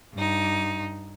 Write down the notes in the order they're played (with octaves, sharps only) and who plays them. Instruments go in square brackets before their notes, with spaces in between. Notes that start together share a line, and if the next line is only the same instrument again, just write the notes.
[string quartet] G2 D#4